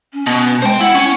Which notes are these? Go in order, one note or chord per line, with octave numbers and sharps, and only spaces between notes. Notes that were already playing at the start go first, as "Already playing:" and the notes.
C#4
B2
G#3 C5 G5
E4 F#5
C#4